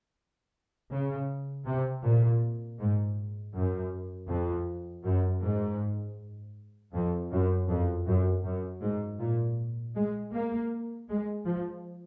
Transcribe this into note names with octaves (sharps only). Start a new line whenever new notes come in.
C#3
C3
A#2
G#2
F#2
F2
F#2
G#2
F2
F#2
F2
F#2
F#2
G#2
A#2
G#3
A#3
G#3
F3